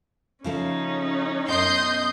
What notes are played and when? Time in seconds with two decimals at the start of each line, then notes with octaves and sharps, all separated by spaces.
0.44 C#3 F3 A3 C#4 D#4
1.48 F#2 B2 D#5 C6 D#6 G6